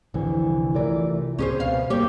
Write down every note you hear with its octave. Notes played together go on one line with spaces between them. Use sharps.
C2 F2 D3 E3
C3 E3 A3 F4 A#4 D5
C#2 C4 C#4 G#4 C5
B2 F5
G2 G3 A#3 G4 C#5